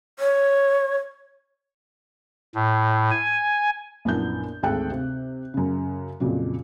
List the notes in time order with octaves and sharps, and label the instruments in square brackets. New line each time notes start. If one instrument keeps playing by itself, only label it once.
[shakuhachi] C#5
[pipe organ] A2
G#5
[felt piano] A#1 F#2 B3 D4 E4 G6
G#1 D2 G#4 A4 G5 F#6
C3
F#2 C#3
F2 A#2 C#3 F#3